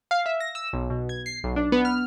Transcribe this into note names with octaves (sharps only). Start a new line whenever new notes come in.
F5
E5
A#6
E6
B1
B2
G#6
C7
B1
D4
B3
F6